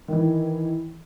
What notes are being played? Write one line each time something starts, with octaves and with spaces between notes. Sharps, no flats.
D#3 E3